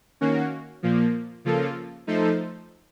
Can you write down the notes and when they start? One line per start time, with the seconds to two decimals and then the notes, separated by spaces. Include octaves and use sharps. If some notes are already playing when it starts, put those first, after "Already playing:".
0.21 D#3 A#3 C#4 F#4
0.83 A#2 F3 A#3
1.45 C#3 F3 A#3 F4 A4
2.07 F3 A3 D#4 A4 C5